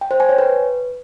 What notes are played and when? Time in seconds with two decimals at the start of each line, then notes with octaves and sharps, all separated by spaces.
0.01 G5
0.11 C5
0.20 G#5
0.29 C#5
0.38 B4